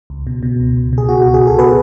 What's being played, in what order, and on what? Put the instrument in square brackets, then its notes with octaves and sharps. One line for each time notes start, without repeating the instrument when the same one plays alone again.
[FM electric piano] C#2
B2
B2
C#2
C#2
B2 G#4
B2 F#4
C#2 F#4
G#4
C#2
F#4 A4
B2 G#4 B4